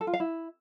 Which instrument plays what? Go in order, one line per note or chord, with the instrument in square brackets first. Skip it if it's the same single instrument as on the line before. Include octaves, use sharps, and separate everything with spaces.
[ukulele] A4
F4
F5
E4